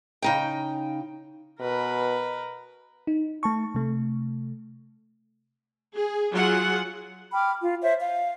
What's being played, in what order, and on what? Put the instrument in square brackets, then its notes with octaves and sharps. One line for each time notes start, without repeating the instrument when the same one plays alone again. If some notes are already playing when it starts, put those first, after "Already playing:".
[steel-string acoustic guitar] C#3 D#4 G5
[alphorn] B2 [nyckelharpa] A#4 B4
[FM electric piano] D#4
A3 A5 C#6
C3 A3
[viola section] G#4
F#3 F4 G#4 F#5
[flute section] G5 B5 D6 F6
F4
C5 C#5 E5
F5